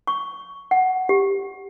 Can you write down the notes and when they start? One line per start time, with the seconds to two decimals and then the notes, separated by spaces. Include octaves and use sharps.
0.07 C#6
0.71 F#5
1.09 G4